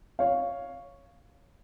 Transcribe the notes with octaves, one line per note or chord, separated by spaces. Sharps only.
C#5 F5